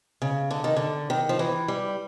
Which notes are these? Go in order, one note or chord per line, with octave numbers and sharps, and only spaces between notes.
C#3
D3
D#3
D3
D#3
F3
E3
G3